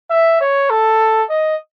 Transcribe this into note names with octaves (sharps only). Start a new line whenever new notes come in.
E5
C#5
A4
D#5